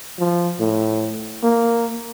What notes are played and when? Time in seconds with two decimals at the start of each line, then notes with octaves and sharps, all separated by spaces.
0.19 F3
0.60 A2
1.43 A#3